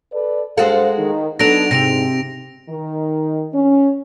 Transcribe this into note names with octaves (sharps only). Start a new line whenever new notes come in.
A4 B4 D5
G2 G#3 F#4 A4 C5 F5
D#3
F#3 B3 D4 D#4 A4 A#6 D7 F7
G#2 C3 A#6 D7 F7
D#3
C#4